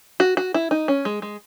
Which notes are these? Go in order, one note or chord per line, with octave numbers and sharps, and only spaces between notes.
F#4
F#4
E4
D#4
C#4
G#3
G#3